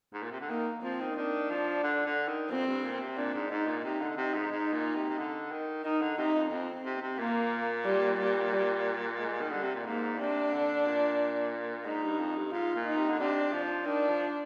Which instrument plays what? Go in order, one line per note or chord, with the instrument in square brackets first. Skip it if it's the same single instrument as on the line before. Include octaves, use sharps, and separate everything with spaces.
[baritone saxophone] G#2
A#2
C3
D3
[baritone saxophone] D#3 [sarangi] A#3
[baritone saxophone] F3 [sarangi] C4
[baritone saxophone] D#3
[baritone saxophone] D#3 [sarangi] D4
[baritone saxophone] F3
D3
D3
D#3
[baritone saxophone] F2 [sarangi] C4
[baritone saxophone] G2
A#2
C3
[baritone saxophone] A#2 [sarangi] D4
[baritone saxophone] G#2
[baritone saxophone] G#2 [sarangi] D#4
[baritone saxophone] A#2
[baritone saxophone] C3 [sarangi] D#4
[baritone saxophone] D3
[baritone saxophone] C3 [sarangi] D#4
[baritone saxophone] G#2
G#2
A#2
C3
C3
D3
D#3
[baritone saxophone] D#3 [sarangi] D#4
[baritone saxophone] D3
[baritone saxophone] C3 [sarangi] D#4
[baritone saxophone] F2
[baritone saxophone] F2 [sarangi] C4
[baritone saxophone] C3
C3
[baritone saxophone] A#2 [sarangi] A#3
[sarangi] G3
G3
G3
G#3
[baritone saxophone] D#3
[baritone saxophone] D3 [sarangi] G3
[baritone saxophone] C3
A#2
[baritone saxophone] G#2 [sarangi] A#3
[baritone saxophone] C3 [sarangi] D4
[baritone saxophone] D3
A#2
[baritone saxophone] G#2 [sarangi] D#4
[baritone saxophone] G2
F2
G2
[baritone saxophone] G#2 [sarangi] F4
[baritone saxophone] A#2
[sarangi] D#4
[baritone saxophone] C3
D3
[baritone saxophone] C3 [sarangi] D4
[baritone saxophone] F3
[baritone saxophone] D#3 [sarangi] D4
[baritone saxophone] F3